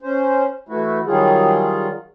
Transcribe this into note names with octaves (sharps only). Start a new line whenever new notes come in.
C#4 C5
E3 A3 E4 F#4
D#3 F#3 G3 F4 G#4